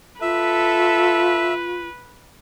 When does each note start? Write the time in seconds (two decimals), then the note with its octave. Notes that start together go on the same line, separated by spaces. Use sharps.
0.22 F4 A4 B4 E5